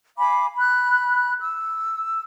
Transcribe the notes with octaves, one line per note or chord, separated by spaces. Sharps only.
F5 G#5 B5 D6
B5 F#6
E6